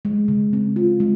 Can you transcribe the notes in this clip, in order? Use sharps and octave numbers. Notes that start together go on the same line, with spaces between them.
G#3
C#3
C4
F4
G#3